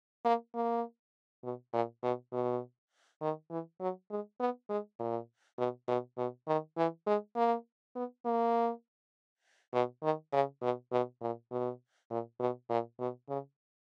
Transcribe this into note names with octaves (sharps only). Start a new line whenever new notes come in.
A#3
A#3
B2
A#2
B2
B2
D#3
E3
F#3
G#3
B3
G#3
A#2
B2
B2
B2
D#3
E3
G#3
A#3
B3
A#3
B2
D#3
C#3
B2
B2
A#2
B2
A#2
B2
A#2
B2
C#3